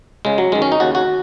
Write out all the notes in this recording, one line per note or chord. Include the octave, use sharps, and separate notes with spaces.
C#2 C#3 G#3
F#3
F#2 D#3 G#3
C#4
D#4
D#2 C#3 F#4
F#4